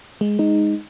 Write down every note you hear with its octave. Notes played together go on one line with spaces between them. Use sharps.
G#3
G#3 D#4